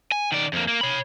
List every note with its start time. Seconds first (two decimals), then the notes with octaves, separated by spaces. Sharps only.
0.12 G#5
0.32 D#3 D5
0.53 F2 A#3
0.68 A#3
0.81 C#5 B5